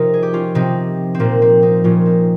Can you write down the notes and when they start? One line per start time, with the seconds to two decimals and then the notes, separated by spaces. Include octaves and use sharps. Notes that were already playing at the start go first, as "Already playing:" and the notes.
Already playing: C3 F3 D#4 F4 A#4
0.14 G#4
0.23 G4
0.33 C#4 F4
0.55 C3 F3 C4 D#4
1.15 C4
1.20 A#2 F3 A#3
1.42 C4
1.62 C4 D#4
1.84 A#2 F3 C#4 F4
2.06 C4 D#4